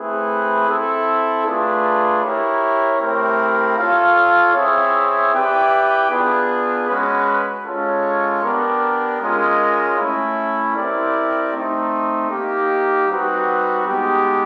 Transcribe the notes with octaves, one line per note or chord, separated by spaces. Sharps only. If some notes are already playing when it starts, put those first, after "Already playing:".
Already playing: A3 C4 E4 G#4 B4
C4 E4 A4
A3 D4 F4 G#4 B4
E4 G4 A#4 C#5
A3 C4 E4 G4 A#4
F4 A4 C#5 F5
C4 E4 G#4 C#5 E5
E4 G4 B4 D5 G5
B3 D4 F4 G#4 B4
G#3 C#4 F#4 B4
G#3 C#4 F4 A4 C#5
B3 D4 G4 A#4
G#3 C#4 F4 A#4 D#5
A3 C#4 E4
C4 E4 G4 A#4 D5
A3 C4 D#4
A#3 D#4 G4
G3 C4 D#4 F#4 B4
G#3 B3 D#4 G4